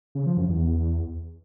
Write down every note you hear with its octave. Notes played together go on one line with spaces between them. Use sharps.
C#3
F3
F#2
E2